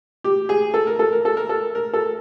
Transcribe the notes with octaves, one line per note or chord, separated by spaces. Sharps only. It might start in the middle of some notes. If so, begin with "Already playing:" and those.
G4
G#4
A4
A#4
A4
A#4
A4
A#4
A4
A#4
A4